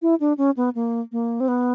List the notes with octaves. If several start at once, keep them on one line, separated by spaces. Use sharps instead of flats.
E4
D4
C#4
B3
A#3
A#3
C4
B3